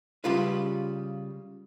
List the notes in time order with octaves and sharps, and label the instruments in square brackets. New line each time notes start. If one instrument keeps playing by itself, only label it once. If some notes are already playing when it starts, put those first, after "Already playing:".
[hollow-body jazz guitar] C#3 G3 F4 B4